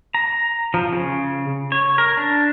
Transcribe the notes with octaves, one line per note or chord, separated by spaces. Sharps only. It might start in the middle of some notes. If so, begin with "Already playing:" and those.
A#5
F3
C#3
C#5
A#4
D4